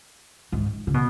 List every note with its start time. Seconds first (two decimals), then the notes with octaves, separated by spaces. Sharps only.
0.52 G#2
0.87 C#3
0.94 B2